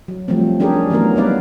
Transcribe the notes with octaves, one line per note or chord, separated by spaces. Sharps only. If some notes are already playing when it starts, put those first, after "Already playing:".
F#3
F3 G3 A3 C4
C#4 D4 G4 G#4 A#4
E3 F#3 A3 B3 A#4
G3 B3 D#4 B4 D5 F5